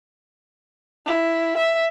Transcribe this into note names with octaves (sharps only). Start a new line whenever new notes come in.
E4
E5